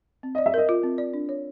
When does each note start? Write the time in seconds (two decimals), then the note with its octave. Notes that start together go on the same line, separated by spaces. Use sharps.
0.23 C4
0.35 D5 D#5
0.46 E5
0.54 A#4 D#5
0.69 F4
0.84 C4
0.98 D5
1.14 D4
1.29 C#5